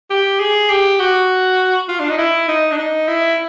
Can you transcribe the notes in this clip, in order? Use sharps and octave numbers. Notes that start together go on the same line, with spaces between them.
G4
G#4
G4
F#4
F4
D4
D#4
E4
D#4
D4
D#4
E4